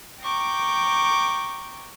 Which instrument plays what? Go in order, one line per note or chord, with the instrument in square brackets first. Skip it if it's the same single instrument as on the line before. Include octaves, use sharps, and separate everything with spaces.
[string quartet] G5 A#5 C#6 D6 G6